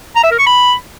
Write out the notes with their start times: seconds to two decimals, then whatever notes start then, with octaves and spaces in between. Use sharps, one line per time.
0.16 A#5
0.23 E5
0.31 A#4
0.39 C#6
0.46 B5